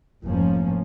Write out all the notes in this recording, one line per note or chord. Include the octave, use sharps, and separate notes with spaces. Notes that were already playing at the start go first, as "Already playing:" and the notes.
F1 G#2 F3 A#3 C#4